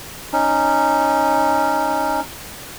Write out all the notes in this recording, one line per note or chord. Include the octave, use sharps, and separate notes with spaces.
C#4 D#4